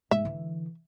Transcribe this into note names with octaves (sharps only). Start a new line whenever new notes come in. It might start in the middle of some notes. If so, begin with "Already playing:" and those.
G#2 E5
D3 E3